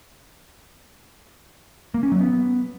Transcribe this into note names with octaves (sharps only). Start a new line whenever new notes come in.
A#3
C#4
F#3
B3